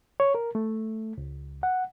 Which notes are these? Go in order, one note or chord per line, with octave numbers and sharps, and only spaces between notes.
C#5
A#4
A3
C#2
F#5